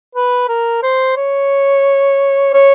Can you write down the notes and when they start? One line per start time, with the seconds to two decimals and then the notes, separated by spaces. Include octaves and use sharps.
0.15 B4
0.48 A#4
0.83 C5
1.17 C#5
2.53 C#5